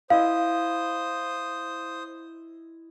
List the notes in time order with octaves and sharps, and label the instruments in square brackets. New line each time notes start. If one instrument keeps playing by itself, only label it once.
[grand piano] E4 D#5 [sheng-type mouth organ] C5 D#6 [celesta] F5